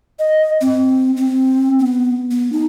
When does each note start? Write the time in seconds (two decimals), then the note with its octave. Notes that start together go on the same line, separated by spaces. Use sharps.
0.19 D#5
0.61 C4
1.17 C4
1.79 B3
2.31 B3
2.52 D#4